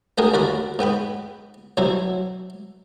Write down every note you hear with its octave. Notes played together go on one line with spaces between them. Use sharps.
A3 B3 D4 G4 G#4 A#4
D#2 F#4 A#4 D5 B5
G#2 B3 G5 B5
B2 F#3 G3 C4 E4